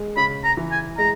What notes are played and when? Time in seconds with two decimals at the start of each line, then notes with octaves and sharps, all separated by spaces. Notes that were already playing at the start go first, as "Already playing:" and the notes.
Already playing: G#3
0.17 C#3 B5
0.44 A#5
0.57 E3
0.71 G#5
0.98 G#3 A#5